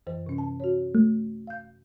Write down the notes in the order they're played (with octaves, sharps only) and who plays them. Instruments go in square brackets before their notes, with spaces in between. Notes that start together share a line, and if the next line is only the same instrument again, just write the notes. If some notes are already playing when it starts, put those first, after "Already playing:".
[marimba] F#2 E3 C5
C3 C#4
A5
F#4 C#5
[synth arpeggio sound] A3
[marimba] F5 G6